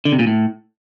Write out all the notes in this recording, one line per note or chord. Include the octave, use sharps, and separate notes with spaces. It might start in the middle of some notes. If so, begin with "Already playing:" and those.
D3
C3
A#2
A2